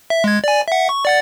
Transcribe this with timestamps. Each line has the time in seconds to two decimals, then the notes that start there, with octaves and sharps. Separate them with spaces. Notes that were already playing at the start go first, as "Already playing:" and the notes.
0.10 E5
0.24 G#3 G#6
0.44 D5 G#5
0.68 E5 F#5
0.89 C#6
1.05 D5 F#5 A6